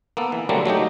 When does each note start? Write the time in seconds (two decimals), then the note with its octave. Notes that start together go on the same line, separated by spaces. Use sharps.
0.17 A#3 B3 A4
0.32 E3
0.49 D3 F#3 G3 A3 A#3 C4
0.65 F#3 A3 D#4 G4